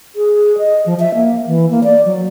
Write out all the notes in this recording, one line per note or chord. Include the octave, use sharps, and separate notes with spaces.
G#4
D#5
F3
E5
A#3
E3
A#3
D5
F#3